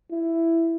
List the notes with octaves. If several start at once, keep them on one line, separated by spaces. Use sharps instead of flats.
E4